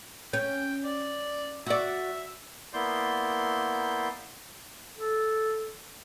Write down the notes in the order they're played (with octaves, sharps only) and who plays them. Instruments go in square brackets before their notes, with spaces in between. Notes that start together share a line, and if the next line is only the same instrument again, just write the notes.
[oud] C#4 [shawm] G5
[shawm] D5
[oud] F#4 D5 [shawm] E5
[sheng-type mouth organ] A#3 B3 E4 D5 C6 G6
[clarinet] A4